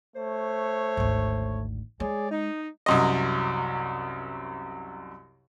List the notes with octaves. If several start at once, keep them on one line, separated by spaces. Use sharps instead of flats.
A3 C5 C#5
G#1 D2
G#3 G#4 C#5 D5
D#4
C2 F#2 D#5